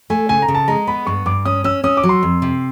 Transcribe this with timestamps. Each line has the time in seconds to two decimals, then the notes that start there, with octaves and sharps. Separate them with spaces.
0.10 A3 G#5
0.29 C#3 G#5
0.42 A#5
0.48 C#3
0.55 A5
0.68 G#3 A#5
0.87 B3 B5
1.07 G2 C#6
1.26 G2 D6
1.45 C#4 D#6
1.64 C#4 E6
1.84 C#4 D#6
1.97 D6
2.03 F#3
2.09 C6
2.23 F2
2.42 C3